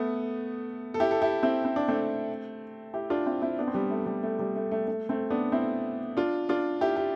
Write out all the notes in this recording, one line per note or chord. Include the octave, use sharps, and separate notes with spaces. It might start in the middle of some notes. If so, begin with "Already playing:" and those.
Already playing: A3 B3
A4
E4 G4
A4
E4 G4
C4 E4
C4
D4
A3 C4
E4 G4
D4 F4
C4 E4
C4 E4
B3 D4
C4
G3 B3
A3
G3
A3
G3
A3
A3
A3
A3 C4
B3 D4
C4 E4
D4 F4
D4 F4
E4 G4
G4